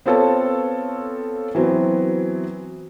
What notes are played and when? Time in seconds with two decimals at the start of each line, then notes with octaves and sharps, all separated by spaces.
0.06 B3 C4 F4 A4 C#5 A5
1.55 E3 F#3 B3 C4